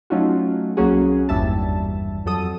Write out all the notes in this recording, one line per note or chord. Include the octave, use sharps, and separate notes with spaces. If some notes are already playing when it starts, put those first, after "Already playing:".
F#3 A3 C#4 D#4 F4 F#4
C2 F#3 A#3 C#4 F#4 G#4
G#1 E2 G2 G3 E5 A5
F2 F#3 A4 D#6